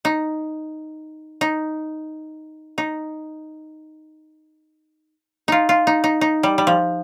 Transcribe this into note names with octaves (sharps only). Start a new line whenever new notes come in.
D#4
D#4
D#4
D#4 F4
F4
D#4
D#4
D#4
G3
G3
F3